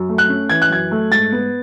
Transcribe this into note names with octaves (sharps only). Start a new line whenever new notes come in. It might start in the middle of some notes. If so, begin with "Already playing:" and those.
Already playing: F#2
A3
F#6
C#4
E3 G#6
F#6
F#2 G#6
A3
G#2 A6
B3